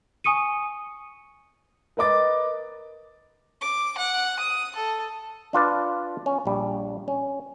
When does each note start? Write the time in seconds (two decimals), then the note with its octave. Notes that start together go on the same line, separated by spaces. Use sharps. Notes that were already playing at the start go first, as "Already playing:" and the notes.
0.24 G#5 C#6 D#6 C#7 D#7
1.97 A#4 B4 D#5 D6 A6
3.61 D6
3.98 F#5
4.39 D#6
4.76 A4
5.53 D4 F4 B4 D5
6.26 C#4
6.46 A#1 G3
7.08 C#4